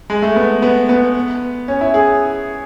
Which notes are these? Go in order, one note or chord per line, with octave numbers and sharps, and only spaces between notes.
G#3
A3
B3
B3
B3
C#4
E4
G#4